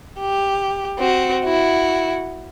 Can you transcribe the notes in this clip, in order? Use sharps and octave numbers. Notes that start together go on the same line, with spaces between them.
G4
C4 F#4
E4 F#4